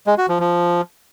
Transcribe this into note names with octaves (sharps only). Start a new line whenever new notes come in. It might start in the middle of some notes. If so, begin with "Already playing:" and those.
G#3
F#4
F3
F3